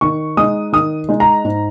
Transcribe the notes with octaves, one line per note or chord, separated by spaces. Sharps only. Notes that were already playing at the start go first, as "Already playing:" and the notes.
D#3 C#6
G#3 D#4 D#6
D#3 D#6
G#3 D#4
A#5
G#2